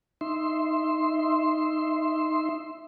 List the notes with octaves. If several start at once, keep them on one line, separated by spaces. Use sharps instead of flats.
D#4 E5 C6